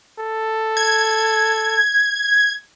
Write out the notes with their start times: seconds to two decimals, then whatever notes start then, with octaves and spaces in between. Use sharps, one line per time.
0.19 A4
0.77 G#6